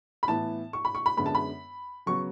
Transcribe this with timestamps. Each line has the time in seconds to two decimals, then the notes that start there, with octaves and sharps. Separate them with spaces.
0.23 B5
0.28 A2 E3 B3 A5
0.73 C#6
0.85 B5
0.95 C#6
1.06 B5
1.17 F#2 D3 G#3 B3 B5
1.26 A5
1.35 B5
2.06 C#3 F#3 B3 C#6